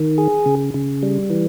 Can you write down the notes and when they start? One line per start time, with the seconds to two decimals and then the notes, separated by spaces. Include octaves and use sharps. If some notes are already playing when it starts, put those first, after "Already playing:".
Already playing: D#3
0.18 G#4
0.46 C#3
0.74 C#3
1.03 G3
1.30 E3